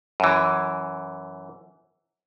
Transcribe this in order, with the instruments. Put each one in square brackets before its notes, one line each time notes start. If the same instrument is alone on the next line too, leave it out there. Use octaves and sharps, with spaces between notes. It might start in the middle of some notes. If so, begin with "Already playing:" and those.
[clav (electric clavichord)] F#2 E3